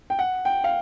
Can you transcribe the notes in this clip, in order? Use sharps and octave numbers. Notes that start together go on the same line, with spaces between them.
G5
F#5
G5
F5